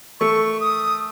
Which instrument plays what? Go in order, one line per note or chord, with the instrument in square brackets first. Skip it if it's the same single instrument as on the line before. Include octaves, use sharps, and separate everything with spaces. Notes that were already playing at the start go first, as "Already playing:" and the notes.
[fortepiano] A3 [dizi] C#6
[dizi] D#6